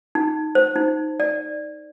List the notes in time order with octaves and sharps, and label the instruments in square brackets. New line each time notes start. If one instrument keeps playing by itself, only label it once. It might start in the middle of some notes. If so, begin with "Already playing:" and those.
[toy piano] D#4
C5
D#4
D5